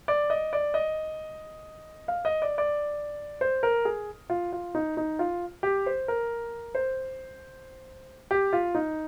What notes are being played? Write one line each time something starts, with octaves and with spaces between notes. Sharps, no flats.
D5
D#5
D5
D#5
F5
D#5
D5
D5
C5
A#4
G#4
F4
F4
D#4
D#4
F4
G4
C5
A#4
C5
G4
F4
D#4